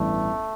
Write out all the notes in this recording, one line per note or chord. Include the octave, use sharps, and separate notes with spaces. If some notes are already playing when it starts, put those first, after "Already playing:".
Already playing: A1 G2 E3 A3 B3